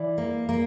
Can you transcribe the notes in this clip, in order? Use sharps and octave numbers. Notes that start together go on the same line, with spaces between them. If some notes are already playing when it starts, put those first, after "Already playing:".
Already playing: E3 D5
A#3
A#3